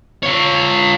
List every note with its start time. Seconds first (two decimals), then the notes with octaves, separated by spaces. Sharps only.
0.23 F4 C#5